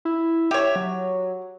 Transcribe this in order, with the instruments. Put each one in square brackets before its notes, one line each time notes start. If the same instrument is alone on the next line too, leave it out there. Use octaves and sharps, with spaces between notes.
[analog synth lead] E4
[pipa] G4 C#5 [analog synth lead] E5
[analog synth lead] F#3